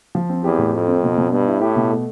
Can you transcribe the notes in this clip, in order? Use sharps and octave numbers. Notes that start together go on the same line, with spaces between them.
F3
C4
E2 G4
A2
F2 A3
C4
B2
B2
G2 B3
E4
A2 G4
B2
A3